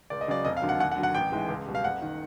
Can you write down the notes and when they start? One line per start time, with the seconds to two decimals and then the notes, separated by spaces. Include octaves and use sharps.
0.10 C#2 D5
0.21 D#5
0.28 C#3 F#3 D5
0.45 F1 D#5
0.57 F5
0.62 D#2 D3 F#3
0.69 F#5
0.80 D#2 F#5
0.92 F#5
0.97 D3 F#3
1.03 F#5
1.15 A1 G5
1.32 G#2 E3 G#3
1.49 C#2
1.66 B2 G3
1.75 F5
1.84 F#1 F#5
2.02 D#3